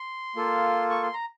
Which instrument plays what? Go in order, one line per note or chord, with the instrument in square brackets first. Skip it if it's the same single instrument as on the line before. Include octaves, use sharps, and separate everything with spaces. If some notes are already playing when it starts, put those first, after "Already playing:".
Already playing: [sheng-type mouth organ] C6
A#3 F4 A4
C#6
C6
A#5